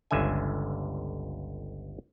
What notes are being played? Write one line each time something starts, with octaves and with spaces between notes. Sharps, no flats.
G1 C#2 D3 E5 G#5